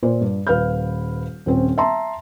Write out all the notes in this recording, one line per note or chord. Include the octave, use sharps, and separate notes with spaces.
A#2 C5
G2
D#1 B4 F5 F6 G6
D#1 C4 C#4
E5 A5 A#5 C6